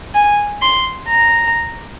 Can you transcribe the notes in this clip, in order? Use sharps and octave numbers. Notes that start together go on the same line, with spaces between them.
G#5
C6
A#5